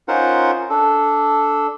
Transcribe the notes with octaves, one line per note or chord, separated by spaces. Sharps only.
C#4 D#4 F4 A#4 C5 F#5
D4 A4